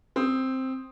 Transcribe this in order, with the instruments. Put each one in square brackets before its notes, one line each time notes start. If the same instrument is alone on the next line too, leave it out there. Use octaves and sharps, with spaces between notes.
[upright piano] C4 D#6